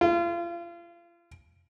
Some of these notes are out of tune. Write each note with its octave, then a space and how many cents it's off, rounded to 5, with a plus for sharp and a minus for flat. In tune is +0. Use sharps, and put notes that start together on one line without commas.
F4 -35